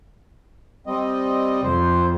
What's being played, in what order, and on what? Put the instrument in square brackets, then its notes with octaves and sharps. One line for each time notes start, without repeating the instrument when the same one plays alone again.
[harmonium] G3 C4 D#5
[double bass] F2 [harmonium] C5